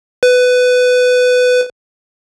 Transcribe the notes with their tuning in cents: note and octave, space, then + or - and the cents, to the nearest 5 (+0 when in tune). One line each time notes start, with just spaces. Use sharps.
B4 +15